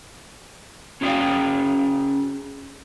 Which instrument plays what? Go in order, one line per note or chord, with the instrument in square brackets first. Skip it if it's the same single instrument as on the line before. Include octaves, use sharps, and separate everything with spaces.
[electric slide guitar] C#4 F#4 G#4 E5 F5 G5